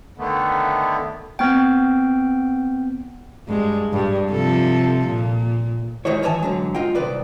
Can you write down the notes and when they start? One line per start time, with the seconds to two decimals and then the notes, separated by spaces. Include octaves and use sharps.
0.18 D3 D#3 A3 B3
1.39 B3 C4 G5
3.48 G2 G#3
3.93 G2
4.30 C3 F3 A4
5.06 A#2
6.05 G#2 D#3 D#4 E4 C#5
6.22 G2 E3 C#5 D#5 G#5 A5
6.42 G#2 D3 F#3
6.75 C#2 F4 D#5 F#5 G5
6.95 C2 D#3 B4 D5